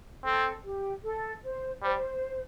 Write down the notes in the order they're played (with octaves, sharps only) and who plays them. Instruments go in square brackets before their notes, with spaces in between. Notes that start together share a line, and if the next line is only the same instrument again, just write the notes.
[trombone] C4 [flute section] A4
[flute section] G4
A4
C5
[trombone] G3 [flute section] C5